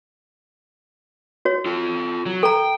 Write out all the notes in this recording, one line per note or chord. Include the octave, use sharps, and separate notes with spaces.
F#4 C#5
F4 A4
F#3
A4 G5 A#5